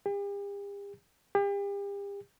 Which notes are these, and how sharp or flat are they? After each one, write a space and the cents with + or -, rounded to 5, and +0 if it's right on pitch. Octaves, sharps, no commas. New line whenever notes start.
G4 +45
G4 +40